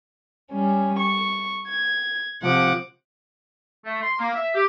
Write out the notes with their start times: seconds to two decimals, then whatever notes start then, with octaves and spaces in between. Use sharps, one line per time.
0.52 G3 C#4
0.97 C#6
1.67 G#6
2.42 C3 F3 F#5 D6
3.85 A3
4.01 C6
4.19 A#3
4.34 E5
4.54 G4